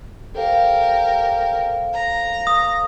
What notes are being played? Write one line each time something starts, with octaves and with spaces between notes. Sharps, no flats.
G4 A4 A#4 C5 F5
A#5
D#6